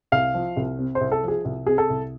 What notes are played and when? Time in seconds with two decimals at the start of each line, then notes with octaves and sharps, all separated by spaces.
0.12 C2 F5
0.34 F3
0.57 C2
0.79 C3
0.95 C5
1.01 C2
1.12 A4
1.23 F3 G#4
1.45 C2
1.67 C3 G#4
1.78 A4
1.90 C2